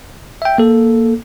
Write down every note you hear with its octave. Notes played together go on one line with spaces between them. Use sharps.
E5 G5
A#3 A4